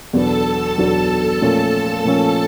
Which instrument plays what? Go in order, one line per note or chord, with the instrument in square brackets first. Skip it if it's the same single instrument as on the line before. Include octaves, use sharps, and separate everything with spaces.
[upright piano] E2 B2 F#3 B3 D4 [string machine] A4 A5
[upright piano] E2 B2 F#3 B3 D4
A#2 F3 A3 C#4
A#2 F3 A3 C#4